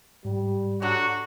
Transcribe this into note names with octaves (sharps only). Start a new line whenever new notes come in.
G#2 G3
D3 F#3 D4 F#4